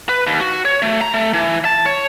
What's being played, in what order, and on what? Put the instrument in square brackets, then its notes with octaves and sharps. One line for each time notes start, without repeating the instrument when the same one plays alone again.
[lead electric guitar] B4
D#2
F#4
C#5
A3
A#5
A3
E3
A5
C#5